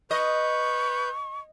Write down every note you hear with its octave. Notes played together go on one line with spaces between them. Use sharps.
B4 D#5 C#6 G6